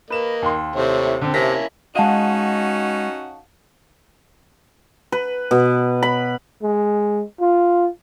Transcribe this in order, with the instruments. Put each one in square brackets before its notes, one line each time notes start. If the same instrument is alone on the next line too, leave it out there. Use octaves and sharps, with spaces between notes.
[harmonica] A#3 D#5 [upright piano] B4 E7
[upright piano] D#2 C6
[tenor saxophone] C3 [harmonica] A3 E4 C#5
[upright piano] D3 C4
[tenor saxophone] C3 [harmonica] A#3 C#4 E4 [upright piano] A5 A#6 B6
[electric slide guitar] G#3 D#5 [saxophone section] C#4 D#4 F#4 [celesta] F5 F#5 A5
[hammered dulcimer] B4
B2
B5
[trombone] G#3
F4